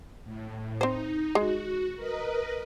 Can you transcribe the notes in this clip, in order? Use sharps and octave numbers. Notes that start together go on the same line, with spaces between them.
A2
C4 D#4 C5
G#3 F#4
A#4 B4 D#5